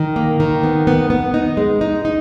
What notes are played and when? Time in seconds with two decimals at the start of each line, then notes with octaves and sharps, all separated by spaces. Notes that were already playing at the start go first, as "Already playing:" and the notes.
Already playing: D#3
0.16 A#3
0.40 D#3
0.63 B3
0.87 B3
1.10 B3
1.34 D#4
1.57 G#3
1.81 D#4
2.05 D#4